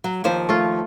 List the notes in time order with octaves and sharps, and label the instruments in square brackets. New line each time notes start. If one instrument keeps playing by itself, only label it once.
[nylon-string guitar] F#3
D#2 F3 C5
[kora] A3 F4